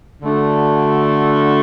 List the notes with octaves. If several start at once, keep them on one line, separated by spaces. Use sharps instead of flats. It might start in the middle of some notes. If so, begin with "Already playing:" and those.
D3 A3 D4 F#4